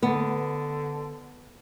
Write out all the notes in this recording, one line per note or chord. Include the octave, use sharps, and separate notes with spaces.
D3 B3